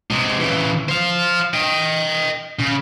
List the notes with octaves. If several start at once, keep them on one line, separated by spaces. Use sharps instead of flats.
C3 G#3
C#3 E3
C5 F5
D#5 G5
C#3